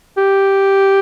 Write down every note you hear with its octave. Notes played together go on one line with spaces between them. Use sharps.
G4